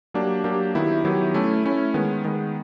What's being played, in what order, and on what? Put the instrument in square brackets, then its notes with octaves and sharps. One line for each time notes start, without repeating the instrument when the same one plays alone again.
[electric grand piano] F#3 A#3 D4 G4
F#3 A#3 D4 G4
D#3 F#3 B3 E4 G4
D#3 F#3 B3 E4 G4
A3 C#4 E4
A3 C#4 E4
D#3 G#3 B3
D#3 G#3 B3